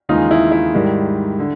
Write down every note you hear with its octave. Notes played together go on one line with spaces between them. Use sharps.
D#2 C#3 E3 G#3 D#4 F4
E4
E4
G#2 D#3 G3
D3